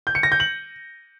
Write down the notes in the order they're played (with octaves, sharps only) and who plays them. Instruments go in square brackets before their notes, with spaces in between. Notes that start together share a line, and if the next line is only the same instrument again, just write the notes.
[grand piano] G6
C#7
A#6
G6
F#7